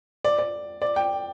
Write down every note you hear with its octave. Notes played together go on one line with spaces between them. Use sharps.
D5
D5
D5
G5